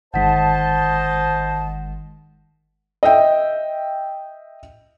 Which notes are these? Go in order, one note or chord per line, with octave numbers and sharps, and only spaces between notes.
G1 D#3 G#3 C5 D#5 F#5 A5 B6
D#5 E5 G5